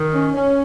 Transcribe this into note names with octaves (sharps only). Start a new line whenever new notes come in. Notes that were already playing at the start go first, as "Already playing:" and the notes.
Already playing: D#3
C#4
C#4